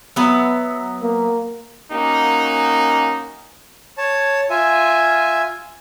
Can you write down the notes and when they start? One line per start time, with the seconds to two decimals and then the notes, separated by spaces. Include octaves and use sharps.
0.16 F#3 B3 E5
1.02 A#3
1.92 A#3 C#4 D#4 F#4
3.98 C#5 A5
4.50 F4 E5 G#5